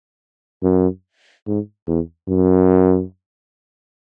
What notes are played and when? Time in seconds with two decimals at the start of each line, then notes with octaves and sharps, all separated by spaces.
0.63 F#2
1.47 G#2
1.87 E2
2.28 F#2